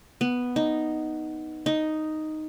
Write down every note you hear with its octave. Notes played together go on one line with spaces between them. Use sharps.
B3
D#4
D#4